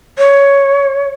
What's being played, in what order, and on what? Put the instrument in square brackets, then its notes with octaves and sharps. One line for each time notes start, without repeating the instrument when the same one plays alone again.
[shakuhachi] C#5